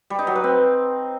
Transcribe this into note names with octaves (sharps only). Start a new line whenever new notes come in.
G3
D#4
F#3
B4
C4